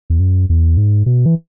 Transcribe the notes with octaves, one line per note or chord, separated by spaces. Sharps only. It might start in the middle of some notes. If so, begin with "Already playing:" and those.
E2
F#2
E2
G#2
B2
E3